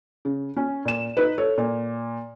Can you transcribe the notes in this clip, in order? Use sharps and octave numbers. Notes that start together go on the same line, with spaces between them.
C#3
C#4
A#2 E7
D#4 B4
A4 C#5
A#2